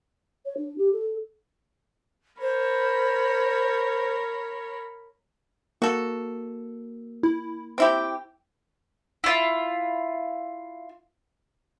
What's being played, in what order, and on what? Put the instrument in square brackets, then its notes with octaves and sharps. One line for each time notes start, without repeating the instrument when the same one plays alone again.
[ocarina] C#5
D4
G4
A4
[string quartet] A#4 C#5 B5 [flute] C5
[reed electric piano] A#3 [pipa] F#4 A4
[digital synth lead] E4
[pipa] C4 E4 G4 [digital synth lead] G5
[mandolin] E4 F4